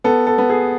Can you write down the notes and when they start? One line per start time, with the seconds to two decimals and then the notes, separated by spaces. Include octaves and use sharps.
0.04 B3 A4
0.27 A4
0.38 B3
0.50 G#4